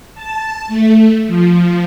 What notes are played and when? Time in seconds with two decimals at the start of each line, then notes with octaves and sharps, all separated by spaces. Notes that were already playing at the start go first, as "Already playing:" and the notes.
0.15 A5
0.68 A3
1.27 F3